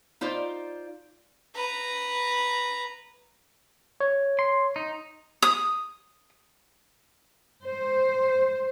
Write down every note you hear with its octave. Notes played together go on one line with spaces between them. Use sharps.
D#4 F4 C5 D5
B4 A#5
C#5
C6
D#4
D#6
C5